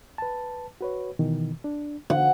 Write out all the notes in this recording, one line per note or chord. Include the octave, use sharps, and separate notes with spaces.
B4 A5
F#4 B4 C#5
B2 D#3 E3
D4
D3 F#5